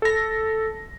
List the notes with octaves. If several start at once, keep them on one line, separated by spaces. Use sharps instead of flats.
A4 A#6